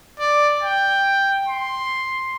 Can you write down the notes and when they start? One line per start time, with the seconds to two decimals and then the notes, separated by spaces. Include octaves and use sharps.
0.20 D5
0.63 G5
1.49 C6